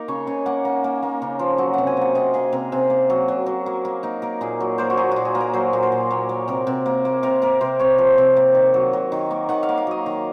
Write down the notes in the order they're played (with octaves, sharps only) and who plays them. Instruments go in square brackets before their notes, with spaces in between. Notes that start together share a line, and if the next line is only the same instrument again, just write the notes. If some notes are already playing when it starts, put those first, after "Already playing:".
Already playing: [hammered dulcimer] A#3 D#4 A#4
C#3 C#5
C#3 G#5
A#3 F#5
A#3
A#3
A#3
C#3
F3
F#3 F#5
C3 F#5
G#5
A#3 F#5
C3 D#5
A#3 G#4
C3 A#4
C3 G#4
A#3
F#3
F#3
F#3
A#3
A#3
A#3 D#4
A#3 A#4
A#2 G#4
F#3
A#3 C5
F#4
F#3 G#4
A#2 F#4
G#4
A#3
A#4
F#3 C5
A#2
C5
A#2
A#3 C#5
A#3
C3 A#4
C3
A#3
A#3
C3 A#4
A#3 A#4
C3 C5
C3 C#5
F3
C3
A#3
D#3
F#3
F#3
D#3
A#3
D#3 F#5
F5
A#3
F5
F#3 D#5
D#3